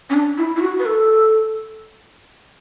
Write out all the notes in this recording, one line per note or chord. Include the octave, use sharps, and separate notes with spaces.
C#4
D4
E4
E4
F#4
B4
A4